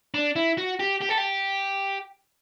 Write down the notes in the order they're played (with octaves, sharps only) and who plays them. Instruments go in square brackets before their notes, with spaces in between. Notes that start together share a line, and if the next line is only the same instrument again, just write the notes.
[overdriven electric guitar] D4
E4
F#4
G4
G4
A4
G4